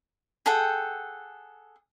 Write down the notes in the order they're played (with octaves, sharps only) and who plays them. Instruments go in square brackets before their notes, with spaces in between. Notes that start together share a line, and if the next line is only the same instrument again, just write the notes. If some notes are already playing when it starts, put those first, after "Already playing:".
[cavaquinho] G#4 A4 F#5 G5